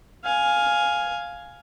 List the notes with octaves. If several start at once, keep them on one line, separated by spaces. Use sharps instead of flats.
F5 G#5